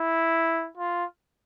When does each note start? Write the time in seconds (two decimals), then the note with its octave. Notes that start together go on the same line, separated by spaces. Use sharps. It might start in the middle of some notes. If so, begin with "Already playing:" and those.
Already playing: E4
0.77 F4